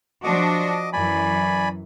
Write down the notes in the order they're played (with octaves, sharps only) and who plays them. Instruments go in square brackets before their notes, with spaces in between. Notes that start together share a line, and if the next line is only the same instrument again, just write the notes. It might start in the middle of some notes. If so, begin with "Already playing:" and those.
[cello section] F3 D4 F#4 [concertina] D#5 D6
[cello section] F#2 E3 [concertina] D5 G#5 B5